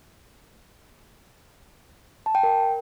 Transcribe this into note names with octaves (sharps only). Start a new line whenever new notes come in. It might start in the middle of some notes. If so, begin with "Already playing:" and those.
A5
G5
A#4